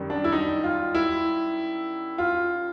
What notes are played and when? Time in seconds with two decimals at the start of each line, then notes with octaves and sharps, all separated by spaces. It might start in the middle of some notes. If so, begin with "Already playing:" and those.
Already playing: F#2 D#3 G3
0.10 D4
0.24 E4
0.32 D#4
0.64 F4
0.95 E4
2.18 F4